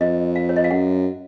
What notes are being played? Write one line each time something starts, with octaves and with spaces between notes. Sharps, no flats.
F2 D#5
F5
C#5
D#5
F5
F#2 F#5